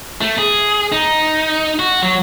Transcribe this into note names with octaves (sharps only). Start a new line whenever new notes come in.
A3
G#4
D#4
F#4
F#3